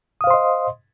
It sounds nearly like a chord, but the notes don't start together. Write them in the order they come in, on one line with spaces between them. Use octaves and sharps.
D#6 F5 C5 C6 D#5